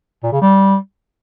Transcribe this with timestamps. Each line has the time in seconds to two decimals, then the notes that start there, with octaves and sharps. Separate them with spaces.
0.23 A#2
0.32 C#3
0.42 G3